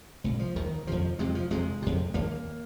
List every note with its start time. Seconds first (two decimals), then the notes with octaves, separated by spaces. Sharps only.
0.24 C2 A#2 G#3
0.39 F3
0.56 D#2 D#3
0.87 F2 C3 F3
1.19 F2 C3 G#3
1.35 F3
1.51 F2 C3 G#3
1.82 F2 C3
2.14 D#2 A#3